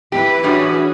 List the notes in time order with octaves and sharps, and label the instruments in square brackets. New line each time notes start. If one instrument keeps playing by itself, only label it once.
[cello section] E3 E4 B4 [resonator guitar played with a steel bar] G4
[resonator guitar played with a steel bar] F#2 A2 G3 [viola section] C#4 F#4 G#4 [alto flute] D4